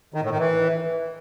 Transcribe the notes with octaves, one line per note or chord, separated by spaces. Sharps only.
D#3
A2
D#3
E3